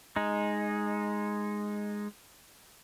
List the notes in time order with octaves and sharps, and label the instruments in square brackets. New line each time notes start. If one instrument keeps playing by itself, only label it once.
[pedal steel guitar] G#3 D#4